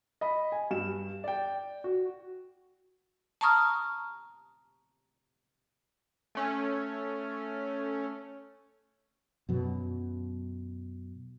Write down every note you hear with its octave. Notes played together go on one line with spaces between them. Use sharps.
D#5 B5
G#5
G2 E7
D5 G5
F#4
A5 A#5 C#6 D#6 F6
A3 C#4
F#2 B2 F#3